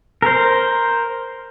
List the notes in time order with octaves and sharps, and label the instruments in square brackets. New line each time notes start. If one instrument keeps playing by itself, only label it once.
[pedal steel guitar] A#4 C5